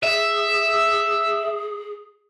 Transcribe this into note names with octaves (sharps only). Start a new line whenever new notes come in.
G#4 E5